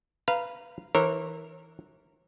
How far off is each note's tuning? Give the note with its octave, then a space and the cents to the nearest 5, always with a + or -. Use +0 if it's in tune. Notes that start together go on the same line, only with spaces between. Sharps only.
B4 +0 F5 -15 A#5 +0
E3 -20 A#4 -15 C#5 -45